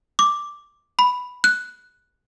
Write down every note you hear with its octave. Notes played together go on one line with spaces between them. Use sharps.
D6
B5
F#6